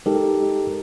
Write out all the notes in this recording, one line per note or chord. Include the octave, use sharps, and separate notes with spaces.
G#3 D#4 G4 A4 A#4